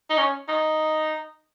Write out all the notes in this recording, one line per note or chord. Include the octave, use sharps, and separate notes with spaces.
D#4
C#4
D#4